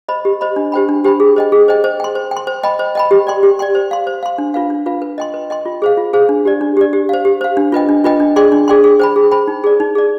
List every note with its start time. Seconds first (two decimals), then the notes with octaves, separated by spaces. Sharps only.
0.08 C5 D#5 B5
0.25 G4
0.41 C5 D#5 B5
0.56 D4
0.72 G4 C5 G5 B5
0.89 D4
1.04 G4 C5 G5 B5
1.20 G#4
1.36 C5 D#5 G5
1.52 G#4
1.68 C5 D#5 G5
1.84 C5
2.00 G5 C6
2.15 C5
2.31 G5
2.37 C6
2.47 C5
2.63 D#5 G5 B5
2.79 C5
2.95 D#5 G5 B5
3.11 G4
3.27 D5 G5 C6
3.43 G4
3.59 D5 G5 C6
3.75 C5
3.91 F5 C6
4.07 C5
4.23 F5 C6
4.38 D4
4.54 F4 B4 F5
4.70 D4
4.86 F4 B4 F5
5.02 B4
5.18 D#5 G5 C6
5.34 B4
5.50 D#5 G5 C6
5.66 F4
5.82 G#4 C5 F5
5.97 F4
6.13 G#4 C5 F5
6.29 D4
6.45 G4 D5
6.61 D4
6.77 G4 D5
6.93 G4
7.09 C5 F5
7.25 G4
7.41 C5 F5
7.57 D4
7.72 F4 B4 D#5 G5
7.89 D4
8.04 F4 B4 D#5 G5
8.20 D4
8.36 G#4 D5 G5 C6
8.52 D4
8.68 G#4 D5 G5 C6
8.84 G#4
8.99 C5 G5 B5
9.16 G#4
9.31 C5 G5 B5
9.48 D#4
9.64 G#4 D5
9.80 D#4
9.95 G#4 D5